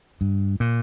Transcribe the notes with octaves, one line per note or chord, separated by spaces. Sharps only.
G2
A#2